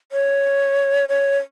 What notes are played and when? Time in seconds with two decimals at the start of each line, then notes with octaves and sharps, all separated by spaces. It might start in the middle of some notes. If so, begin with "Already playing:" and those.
0.12 C#5
1.09 C#5